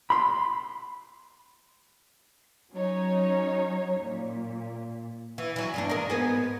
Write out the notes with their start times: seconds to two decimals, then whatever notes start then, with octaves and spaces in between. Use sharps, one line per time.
0.10 B5 C6
2.72 F#3 C#4 D#4 C#5
4.02 A#2
5.38 E3
5.56 E3 F#3
5.74 E2 G2 D4
5.89 G#3 A#4
6.10 G#2 B3 G#4